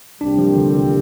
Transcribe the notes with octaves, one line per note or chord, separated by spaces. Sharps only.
C2 A#2 G3 C4 D4 G4
F3
D3